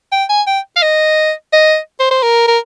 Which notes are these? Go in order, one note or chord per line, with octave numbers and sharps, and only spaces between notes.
G5
G#5
G5
F5
D#5
D#5
C5
C5
A#4
A#4